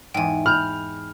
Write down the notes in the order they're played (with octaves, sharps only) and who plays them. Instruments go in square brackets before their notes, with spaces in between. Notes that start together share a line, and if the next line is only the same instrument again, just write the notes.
[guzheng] E2 G#2 [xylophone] G5 G#5
[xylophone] B5 G6 F7 [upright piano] F6